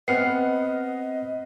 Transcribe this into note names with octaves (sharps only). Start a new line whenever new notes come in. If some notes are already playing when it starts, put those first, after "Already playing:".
B3 C4 D#5 F#5 F6 C7 C#7